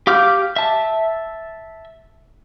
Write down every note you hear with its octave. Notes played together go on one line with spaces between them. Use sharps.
G4 F5 D6 F6 G6
E5 A5